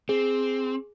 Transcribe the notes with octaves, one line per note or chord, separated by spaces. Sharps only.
C4 G#4